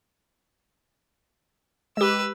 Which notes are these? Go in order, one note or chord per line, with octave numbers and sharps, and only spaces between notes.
G#3 G4 B4 E6